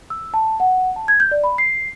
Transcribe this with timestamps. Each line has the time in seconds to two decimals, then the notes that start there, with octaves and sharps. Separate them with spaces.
0.10 E6
0.34 A5
0.60 F#5
0.96 A5
1.08 G#6
1.20 G6
1.31 D5
1.44 B5
1.58 C7